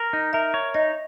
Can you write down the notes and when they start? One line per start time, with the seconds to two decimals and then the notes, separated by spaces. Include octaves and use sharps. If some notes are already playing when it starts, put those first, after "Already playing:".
Already playing: A#4
0.13 D#4
0.33 A#4 E5
0.54 C#5
0.74 D#4 D#5